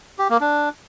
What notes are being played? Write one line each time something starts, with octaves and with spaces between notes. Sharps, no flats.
G4
A#3
D4